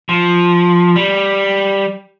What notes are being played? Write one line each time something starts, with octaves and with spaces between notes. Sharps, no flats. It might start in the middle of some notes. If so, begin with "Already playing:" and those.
F3
G3